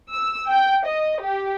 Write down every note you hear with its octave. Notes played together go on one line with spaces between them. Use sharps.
E6
G5
D#5
G4